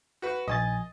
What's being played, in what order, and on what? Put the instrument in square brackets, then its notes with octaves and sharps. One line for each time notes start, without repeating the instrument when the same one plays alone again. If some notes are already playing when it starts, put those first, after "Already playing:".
[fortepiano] F#4 B4
[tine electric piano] A#1 G#5 A6 [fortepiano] D#5